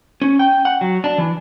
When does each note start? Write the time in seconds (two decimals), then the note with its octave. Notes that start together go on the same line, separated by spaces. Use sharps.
0.22 C#4
0.39 G5
0.65 F#5
0.81 F#3
1.04 D4
1.18 E3